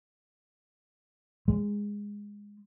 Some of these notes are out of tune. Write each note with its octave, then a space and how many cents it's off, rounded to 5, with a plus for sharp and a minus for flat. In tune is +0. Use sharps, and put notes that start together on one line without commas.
G#3 -15